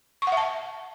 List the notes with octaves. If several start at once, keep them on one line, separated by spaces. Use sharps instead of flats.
C#6
F#5
E5
A5